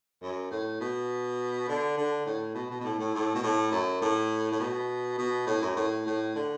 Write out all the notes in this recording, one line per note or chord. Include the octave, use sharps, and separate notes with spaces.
F#2
A2
B2
D3
D3
A2
B2
B2
B2
A2
A2
A2
B2
A2
F#2
A2
A2
B2
B2
A2
F#2
A2
A2
D3